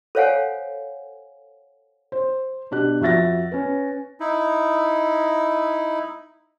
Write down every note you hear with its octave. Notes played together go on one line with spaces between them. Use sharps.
A4 C5 C#5 F5 F#5 G#5
C5
B2 D4 G4 F#6
F2 F#4 E5 A6 A#6
C#4 B4
D#4 E4